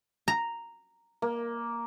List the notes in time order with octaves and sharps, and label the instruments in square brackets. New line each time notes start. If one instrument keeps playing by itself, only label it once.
[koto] A#5
[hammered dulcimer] A#3